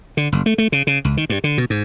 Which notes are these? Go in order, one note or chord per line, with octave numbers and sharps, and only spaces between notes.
D3
F#1
A3
A3
C#3
C#3
C#2
D#3
G2
D3
B2
G#2